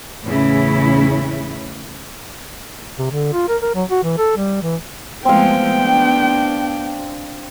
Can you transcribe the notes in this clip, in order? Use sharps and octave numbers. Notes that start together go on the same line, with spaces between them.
E2 A2 C#3 C#4 E4
C3
D3
F4
A#4
A#4
F#3
F#4
E3
A4
G3
E3
F3 G#3 A3 B3 C4 F5 G5
D4